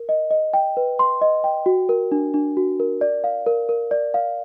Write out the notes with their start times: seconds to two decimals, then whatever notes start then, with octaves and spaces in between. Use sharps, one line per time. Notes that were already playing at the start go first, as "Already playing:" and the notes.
Already playing: A#4
0.09 D#5
0.31 D#5
0.54 G5
0.77 B4
0.99 C6
1.21 D#5
1.44 G5
1.66 F#4
1.89 A#4
2.12 D4
2.34 D4
2.57 F#4
2.80 A#4
3.01 D5
3.24 F5
3.46 A#4
3.69 A#4
3.91 D5
4.14 F5